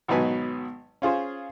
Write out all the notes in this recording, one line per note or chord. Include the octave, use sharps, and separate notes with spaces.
G#1 B2 F#3 D#4 B4 G#5
C#4 F4 G#4 C5